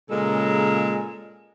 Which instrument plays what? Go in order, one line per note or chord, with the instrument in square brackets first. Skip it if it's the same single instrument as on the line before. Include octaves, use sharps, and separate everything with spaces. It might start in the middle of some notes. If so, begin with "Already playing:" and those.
[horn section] A#2 C#3 G#3 A4 A#4